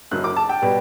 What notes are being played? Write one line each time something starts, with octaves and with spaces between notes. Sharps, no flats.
F#1 F#2 F#3 F#6
D6
A5
G5
B2 G3